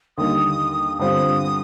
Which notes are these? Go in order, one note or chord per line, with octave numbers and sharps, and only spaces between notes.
D#2 D3 G3 A#3 D#4 D#6
G2 D3 G3 C4 F4 D#6